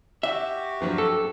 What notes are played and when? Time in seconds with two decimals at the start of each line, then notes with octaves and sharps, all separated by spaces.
0.23 F#4 G4 E5
0.80 G2 F3 F#3
0.98 A4